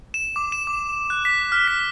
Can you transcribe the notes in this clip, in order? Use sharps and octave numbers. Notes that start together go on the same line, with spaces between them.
E7
D6
E7
D6
F#6
B6
F6
B6